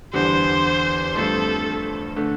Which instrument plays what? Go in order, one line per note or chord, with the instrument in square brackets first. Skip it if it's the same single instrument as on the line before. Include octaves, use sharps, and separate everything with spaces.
[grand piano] E2 D3 G3 [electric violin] C5
[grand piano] G2 F3 A3 C4 [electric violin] A4
[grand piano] D3 A3